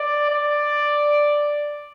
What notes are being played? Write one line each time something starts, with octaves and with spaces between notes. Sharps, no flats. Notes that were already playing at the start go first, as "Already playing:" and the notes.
Already playing: D5
D5